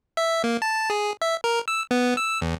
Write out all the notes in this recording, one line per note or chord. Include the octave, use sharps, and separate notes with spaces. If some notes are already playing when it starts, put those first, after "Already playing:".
E5
A#3
A5
G#4
E5
A#4
E6
B3
E6
E2